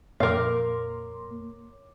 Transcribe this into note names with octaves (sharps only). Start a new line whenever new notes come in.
F2 A#2 A#3 A#4 C#5 F5 C6 D6